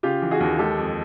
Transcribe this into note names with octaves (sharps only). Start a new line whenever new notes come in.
C#3 F4 G4
E3
F#4 G#4
D#2
G#3 G4 A4
F2